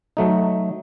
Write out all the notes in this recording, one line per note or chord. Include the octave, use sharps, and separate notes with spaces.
F#3 A3 D#4